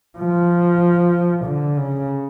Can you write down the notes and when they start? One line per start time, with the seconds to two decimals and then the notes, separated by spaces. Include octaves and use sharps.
0.18 F3
1.45 D3
1.77 C#3